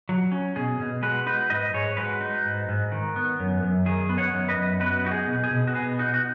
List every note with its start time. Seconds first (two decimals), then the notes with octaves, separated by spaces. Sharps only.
0.09 F#3
0.32 C#4
0.56 B2 G#4
0.80 B2
1.02 G#3 F#4 B4
1.26 D#4 F#4 B4
1.50 G#2 B4 D#5
1.73 G#2 G#4 C#5
1.97 G#3 F#4 B4
2.21 D#4
2.45 G#2
2.69 G#2
2.92 D#3
3.16 B3
3.40 F#2
3.63 F#2
3.86 D#3 G#4
4.09 B3
4.18 C#5 F#5
4.34 F#2
4.48 B4 D#5
4.57 F#2
4.80 B3 F#4 B4
5.05 D#4 F#4
5.11 G#4
5.28 B2
5.44 G#4
5.51 B2
5.67 F#4
5.74 B3 G#4
5.99 D#4 F#4
6.14 F#4